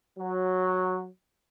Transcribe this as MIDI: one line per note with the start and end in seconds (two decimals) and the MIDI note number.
0.18 1.06 54